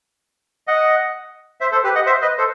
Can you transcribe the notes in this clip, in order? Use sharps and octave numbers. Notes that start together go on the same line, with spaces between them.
D#5 F#5
C5 E5
A4 C5
G4 B4
D#5 F#5
C5 E5
B4 D#5
A4 C5